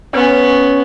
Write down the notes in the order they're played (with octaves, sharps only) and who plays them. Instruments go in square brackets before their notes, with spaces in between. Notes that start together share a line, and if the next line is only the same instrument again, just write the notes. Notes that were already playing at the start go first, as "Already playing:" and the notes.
[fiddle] B3 [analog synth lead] C#4